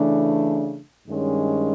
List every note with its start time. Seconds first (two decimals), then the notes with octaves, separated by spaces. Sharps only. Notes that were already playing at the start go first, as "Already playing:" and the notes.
Already playing: C#3 E3 A3 D4
1.07 G2 D#3 G#3 C#4